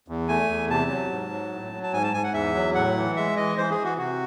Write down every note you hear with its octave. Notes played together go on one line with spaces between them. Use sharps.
E2
A3 G#5
E2
C3 A5
F#3
G#2
F#3
A2
F#3
A5
G#2 G#5
A5
G#2 G#5
F#5
E2 E5
F#3
A2 F#5
E3
G#3 E5
E3 D#5
E3 C5
G#4
E3
F#4
C3 F#4